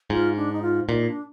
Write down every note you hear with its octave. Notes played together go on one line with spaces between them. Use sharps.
G#2 F4
D4
D#4
F4
A#2 D#4
D4